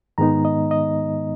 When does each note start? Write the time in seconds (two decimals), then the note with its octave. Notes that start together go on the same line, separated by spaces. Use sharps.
0.18 G#2 D#3 G#3 B3 D#4 A#5
0.45 D#5
0.71 D#5